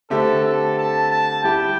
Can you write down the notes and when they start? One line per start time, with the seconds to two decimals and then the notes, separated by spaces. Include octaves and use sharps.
0.10 D3 A3 C4 G4 A4 E5
0.45 A4
0.78 A5
1.11 A5
1.44 G3 E4 G4 G5